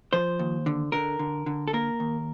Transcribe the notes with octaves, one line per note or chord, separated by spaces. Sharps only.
F3 C5
D#2
D3
D3 A#4
D3
D3
A4
A#3 A#4
D#2